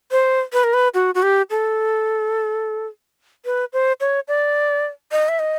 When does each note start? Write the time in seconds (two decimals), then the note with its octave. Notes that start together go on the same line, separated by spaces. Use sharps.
0.11 C5
0.53 B4
0.64 A#4
0.74 B4
0.94 F#4
1.15 F#4
1.23 G4
1.50 A4
3.45 B4
3.73 C5
4.00 C#5
4.28 D5
5.12 D#5
5.29 E5
5.39 D#5